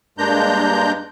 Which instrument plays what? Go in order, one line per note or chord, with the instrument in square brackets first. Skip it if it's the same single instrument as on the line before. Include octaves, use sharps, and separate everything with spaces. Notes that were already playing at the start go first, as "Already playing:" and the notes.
[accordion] G2 G#3 A#3 D4 A#5 G6